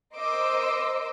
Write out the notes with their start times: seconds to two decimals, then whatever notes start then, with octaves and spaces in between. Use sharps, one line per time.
0.14 A#4 C5 D#5 C6 D6 E6